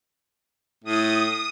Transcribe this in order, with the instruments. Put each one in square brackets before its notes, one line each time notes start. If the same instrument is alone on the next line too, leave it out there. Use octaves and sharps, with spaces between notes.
[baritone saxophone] A2 [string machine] D#6